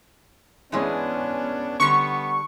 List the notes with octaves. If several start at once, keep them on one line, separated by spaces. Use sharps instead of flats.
E3 G#3 B3 C#4 D4 G#4
D3 G3 B3 C#6